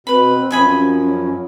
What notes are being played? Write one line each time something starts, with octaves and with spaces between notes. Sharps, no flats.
B2 C4 B4 B5
F#2 F3 D#5 G#5 B5
C#4